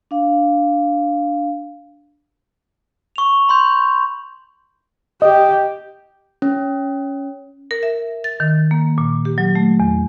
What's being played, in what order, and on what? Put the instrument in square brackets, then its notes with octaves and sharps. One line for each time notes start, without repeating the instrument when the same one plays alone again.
[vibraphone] D4 F5
[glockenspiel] C#6 F7
B5 C6 G6
[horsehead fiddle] G4 [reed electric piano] D#5
[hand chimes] C#4
[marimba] A#4
E5
A6
D#3
A#3
A#2
G4
F#3
A3
E2